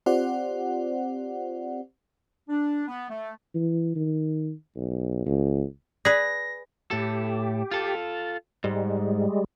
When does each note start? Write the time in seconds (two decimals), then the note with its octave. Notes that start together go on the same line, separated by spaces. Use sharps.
0.06 C4 F4 G4 C5 D5 F#5
2.49 D4
2.88 B3
3.10 A3
3.55 E3
3.96 D#3
4.76 B1
5.26 C#2
6.05 G#4 B4 D5 A#6
6.91 A2 G4 A4
7.71 F4 A4
8.64 G#2 G3 G#3